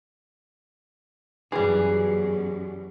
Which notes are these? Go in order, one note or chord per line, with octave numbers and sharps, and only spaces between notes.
F#2 B2 E3 G3 G#4